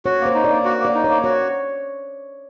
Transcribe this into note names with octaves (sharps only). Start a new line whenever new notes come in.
F#4 C#5
A#3
C5
D#4
D5
A#3
F#4
A#3 D5
D#4
C#5
A#3
F#4 C#5